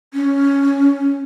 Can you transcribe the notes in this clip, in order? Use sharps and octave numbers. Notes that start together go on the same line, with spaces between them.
C#4